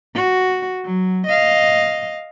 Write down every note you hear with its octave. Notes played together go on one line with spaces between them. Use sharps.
F#4
F#3
D#5 F5